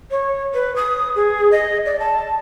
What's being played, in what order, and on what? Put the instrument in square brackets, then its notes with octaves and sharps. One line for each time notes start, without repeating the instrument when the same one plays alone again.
[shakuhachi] C#5
B4
D#6
G#4
D#5
D5
A5